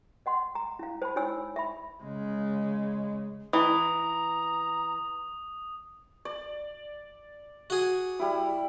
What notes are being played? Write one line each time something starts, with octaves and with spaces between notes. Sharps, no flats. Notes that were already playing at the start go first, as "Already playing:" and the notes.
D#5 F#5 C6
A#5
E4 F5
C5 A5 B5
D#4 E4 C#5 G#5 E6
E5 B5
C#3 G#3
E3 A#5 D#6
D5
F#4 G#4
G3 E4